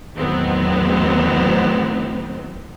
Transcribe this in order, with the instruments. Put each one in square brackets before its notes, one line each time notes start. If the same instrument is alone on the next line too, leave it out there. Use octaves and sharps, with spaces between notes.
[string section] E2 A2 D#3 F#3 B3 C4